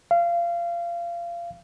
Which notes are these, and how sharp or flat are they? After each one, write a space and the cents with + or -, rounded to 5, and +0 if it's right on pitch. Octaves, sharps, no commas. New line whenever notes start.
F5 -25